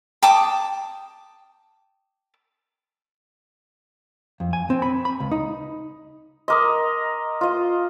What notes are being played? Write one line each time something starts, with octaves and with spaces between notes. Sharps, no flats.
G5 A5 D6 D#6
F2
G#5
C4
B5
B5
C#2
D#4
A#4 D#5 C6 D6 D#6
F4 D#5